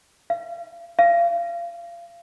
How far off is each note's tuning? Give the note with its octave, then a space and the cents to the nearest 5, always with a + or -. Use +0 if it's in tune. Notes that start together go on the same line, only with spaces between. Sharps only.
F5 -40
F5 -30